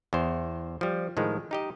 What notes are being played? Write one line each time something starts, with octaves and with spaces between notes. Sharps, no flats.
E2 C5
F3 G3
A2 D#3 F3 G#3
D#4 G4 D#5